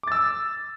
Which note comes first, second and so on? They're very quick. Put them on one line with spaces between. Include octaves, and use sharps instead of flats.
D6 A6 E6